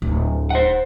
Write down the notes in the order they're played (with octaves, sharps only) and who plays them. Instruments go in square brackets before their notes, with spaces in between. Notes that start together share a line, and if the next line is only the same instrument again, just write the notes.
[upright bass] D1
[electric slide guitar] C5 F#5